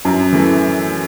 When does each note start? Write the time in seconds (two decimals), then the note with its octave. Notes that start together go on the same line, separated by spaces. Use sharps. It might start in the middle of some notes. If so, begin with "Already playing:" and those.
0.05 F#2
0.32 E3 A3